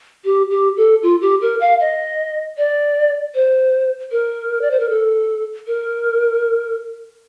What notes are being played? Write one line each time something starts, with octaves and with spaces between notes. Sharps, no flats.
G4
G4
A4
F4
G4
A#4
F5
D#5
D5
C5
A#4
D5
C5
A#4
A4
A#4